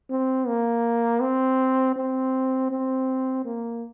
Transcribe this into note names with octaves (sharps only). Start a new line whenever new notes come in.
C4
A#3
C4
C4
C4
A#3